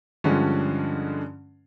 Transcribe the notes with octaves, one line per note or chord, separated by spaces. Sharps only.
G2 D3 F3 G#3 C#4